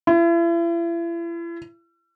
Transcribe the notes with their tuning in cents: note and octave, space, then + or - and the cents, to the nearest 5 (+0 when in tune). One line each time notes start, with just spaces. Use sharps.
E4 +40